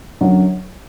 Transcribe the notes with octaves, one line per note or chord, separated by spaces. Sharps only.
F#2 D3 F#3